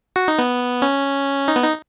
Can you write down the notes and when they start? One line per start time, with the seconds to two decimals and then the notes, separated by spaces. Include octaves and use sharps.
0.16 F#4
0.28 D#4
0.39 B3
0.82 C#4
1.48 D#4
1.56 B3
1.64 D#4